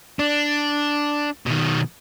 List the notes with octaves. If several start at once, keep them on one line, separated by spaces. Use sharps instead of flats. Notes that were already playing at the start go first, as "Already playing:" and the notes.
D4
B2 D#3